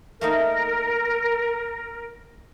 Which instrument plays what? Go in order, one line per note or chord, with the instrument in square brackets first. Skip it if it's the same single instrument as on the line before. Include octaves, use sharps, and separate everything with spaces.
[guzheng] A3 A#3 D#4 [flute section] A#4